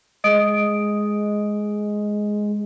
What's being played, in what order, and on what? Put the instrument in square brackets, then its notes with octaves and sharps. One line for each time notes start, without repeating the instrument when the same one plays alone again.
[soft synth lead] G#3 [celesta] D#5 D#6 D7